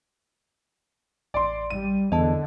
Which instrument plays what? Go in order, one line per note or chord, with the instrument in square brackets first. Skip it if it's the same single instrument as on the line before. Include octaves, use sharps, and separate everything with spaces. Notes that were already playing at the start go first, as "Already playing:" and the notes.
[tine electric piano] A1 [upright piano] D5 C6
[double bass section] G3 [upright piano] D#7
[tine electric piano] E2 [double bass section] D3 [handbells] D#5 A5